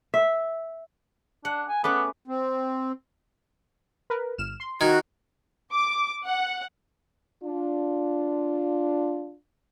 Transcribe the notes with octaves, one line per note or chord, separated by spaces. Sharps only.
E5
D4 F#5
G#5
A3 B3 C#4 B4 D6
C4
A#4 B4
G1 F6 E7
C6
D#3 F#4 G#6
D6
F#5
D4 F4